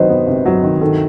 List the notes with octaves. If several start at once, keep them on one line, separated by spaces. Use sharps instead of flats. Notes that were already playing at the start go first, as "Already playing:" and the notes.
Already playing: C3 D#3 F#3 B4 C5 D#5
B3
C3
F#3
D#3
D#3 A4